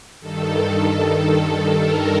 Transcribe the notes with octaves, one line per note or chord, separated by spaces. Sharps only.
G2 D#3 A4
A4
A4
A4
A#4